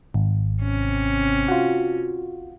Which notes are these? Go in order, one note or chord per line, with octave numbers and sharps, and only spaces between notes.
G#1
C3 C#4
F4 F#4